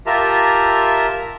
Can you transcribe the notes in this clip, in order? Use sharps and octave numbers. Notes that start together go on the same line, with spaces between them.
F4 G4 A#4 E5 A5 A#5